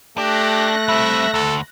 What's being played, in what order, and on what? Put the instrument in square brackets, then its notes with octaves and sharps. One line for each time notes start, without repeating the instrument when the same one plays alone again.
[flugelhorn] A3 [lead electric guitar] D4 [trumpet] G4 [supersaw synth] F#6 A#6
[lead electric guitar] G3 C4 [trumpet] E5
[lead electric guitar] D2 [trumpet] A4